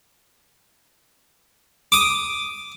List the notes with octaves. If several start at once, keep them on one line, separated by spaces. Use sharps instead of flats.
D6 D#6